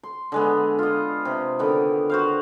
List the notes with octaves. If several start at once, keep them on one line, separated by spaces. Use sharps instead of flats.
C6
D3 G#3 B3
F4 D#5
C3
D3 D#3 B3
F#4 C5 F5